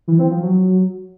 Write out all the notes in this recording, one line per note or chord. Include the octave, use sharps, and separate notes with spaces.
E3
C4
F3
F#3